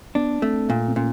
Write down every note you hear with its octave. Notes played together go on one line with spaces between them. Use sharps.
B3 D4
A3 C4
A#2
C4
A#2 C#4